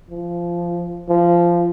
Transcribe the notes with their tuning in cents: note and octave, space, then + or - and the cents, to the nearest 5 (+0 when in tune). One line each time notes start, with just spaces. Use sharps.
F3 -15
F3 -15